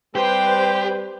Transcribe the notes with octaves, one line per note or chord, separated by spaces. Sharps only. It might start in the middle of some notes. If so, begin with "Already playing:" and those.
G3 C4 G4 B4 C5 G5